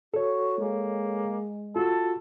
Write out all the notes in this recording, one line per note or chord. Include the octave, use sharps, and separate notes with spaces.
F#4 A4 C#5
G#3 A#3
F4 F#4 A4